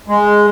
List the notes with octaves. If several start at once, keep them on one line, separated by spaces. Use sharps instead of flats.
G#3